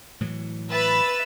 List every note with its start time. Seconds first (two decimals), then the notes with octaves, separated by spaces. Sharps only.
0.21 A2 E3 F#3
0.70 B4 E5 E6 A6